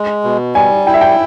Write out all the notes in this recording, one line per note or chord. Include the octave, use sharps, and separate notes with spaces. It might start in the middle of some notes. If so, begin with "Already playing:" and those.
Already playing: G#3
B2
G3 G#5
E4 G5
E5
G5